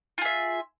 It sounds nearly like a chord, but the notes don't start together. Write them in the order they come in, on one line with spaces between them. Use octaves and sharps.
F4 G#4 E5